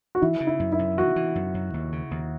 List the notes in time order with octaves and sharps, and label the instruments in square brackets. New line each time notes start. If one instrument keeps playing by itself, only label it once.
[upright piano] F#4
[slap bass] E3 [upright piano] E4
[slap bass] C#3
[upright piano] E4
[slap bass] F#2
[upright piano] E4
[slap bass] F#2
[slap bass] E3 [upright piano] F#4
[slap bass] E3
F#2
F#2
D#2
C#3
D#2